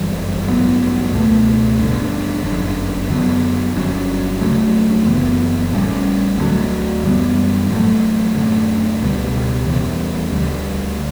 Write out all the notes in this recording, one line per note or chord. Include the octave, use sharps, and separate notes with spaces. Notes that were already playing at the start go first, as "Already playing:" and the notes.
Already playing: G1 F#2 E3 G3
A1 G2 F#3 B3
C#2 B2 A3
A1 G2 D3
G1 F#2 D3
F#2 D3 F#3 B3
G1 G2 F#3 C#4
D2 C#3 F#3 A3
F#1 F#2 E3 B3
A1 A2 G3 C#4
D2 D3 F#3
F#2 E3 G3 B3
A1 A2 F#3 A3
F#2 D3 A3
C#2 B2 G3
E2 C#3 E3 G3
D2 D3 G3